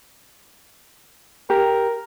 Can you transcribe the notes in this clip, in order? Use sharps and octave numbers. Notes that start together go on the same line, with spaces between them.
G4 A#4